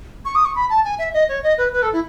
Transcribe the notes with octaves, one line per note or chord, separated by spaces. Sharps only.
C#6
D#6
C#6
B5
A5
G#5
E5
D#5
C#5
D#5
B4
B4
A4
E4